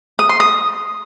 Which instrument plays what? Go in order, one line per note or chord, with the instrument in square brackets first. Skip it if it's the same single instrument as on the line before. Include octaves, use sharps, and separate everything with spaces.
[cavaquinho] D#6
C6
D#6